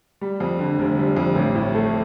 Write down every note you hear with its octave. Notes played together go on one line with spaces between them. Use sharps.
G3
F2
D3
F1
G3
F2
A1
A2
A3